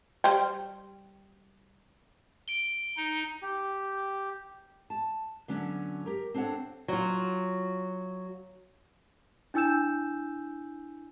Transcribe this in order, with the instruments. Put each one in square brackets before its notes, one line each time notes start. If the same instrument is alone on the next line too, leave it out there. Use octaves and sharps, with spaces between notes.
[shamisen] G3 C5 G5
[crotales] D7 G7
[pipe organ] D#4
[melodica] G4
[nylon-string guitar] A5
D3 F#3 B3 C#4 D4
G4 A#4
C4 D4 A4 C#5 F#5
F#3 F4
[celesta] D4 E4 G#5 E6 G6 E7